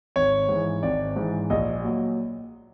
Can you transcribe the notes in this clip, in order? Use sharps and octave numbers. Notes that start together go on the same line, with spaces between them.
G#1 C#5
G#2 E3
G#1 D5
G#2 E3
A#1 D#5
A#2 F#3